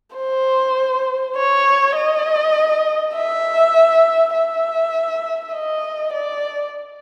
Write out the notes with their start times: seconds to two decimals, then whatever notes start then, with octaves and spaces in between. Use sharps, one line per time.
0.16 C5
1.36 C#5
1.96 D#5
3.15 E5
4.33 E5
5.53 D#5
6.13 D5